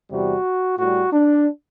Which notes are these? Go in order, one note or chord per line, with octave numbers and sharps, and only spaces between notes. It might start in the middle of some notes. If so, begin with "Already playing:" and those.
E2 C3 G3 F#4
A2 G3 F#4
D4